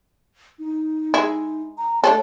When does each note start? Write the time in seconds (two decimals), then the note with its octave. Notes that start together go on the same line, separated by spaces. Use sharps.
0.59 D#4
1.14 G#3 E4
1.78 A#5
2.04 A3 D4 A4 C#5